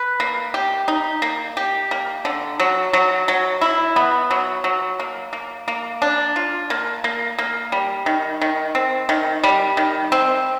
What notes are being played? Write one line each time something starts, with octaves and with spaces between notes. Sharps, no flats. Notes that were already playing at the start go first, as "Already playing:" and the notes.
Already playing: B4
A#3
G4
D#4
A#3
G4
A#3
D3
F#3
F#3
F#3
E4
B3
F#3
F#3
A#3
A#3
A#3
D4
F4
A#3
A#3
A#3
G3
D#3
D#3
C4
D#3
G3
D#3
C4